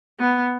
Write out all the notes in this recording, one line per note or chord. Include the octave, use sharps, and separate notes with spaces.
B3